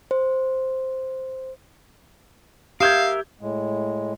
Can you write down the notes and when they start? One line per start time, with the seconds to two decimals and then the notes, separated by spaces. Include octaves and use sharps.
0.11 C5
2.81 G4 A#4 E5 F5 D#6 G6 G#6
3.41 A2 G#3